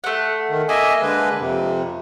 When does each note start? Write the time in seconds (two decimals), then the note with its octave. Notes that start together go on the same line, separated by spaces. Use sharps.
0.04 A3 F#5
0.50 D#3
0.69 A#3 D#5 E5 G#5
1.02 D3 G#3 B4
1.39 F2 C3